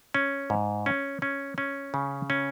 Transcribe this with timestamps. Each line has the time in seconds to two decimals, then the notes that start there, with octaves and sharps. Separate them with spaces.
0.14 C#4
0.50 G#2
0.86 C#4
1.22 C#4
1.58 C#4
1.94 C#3
2.30 C#4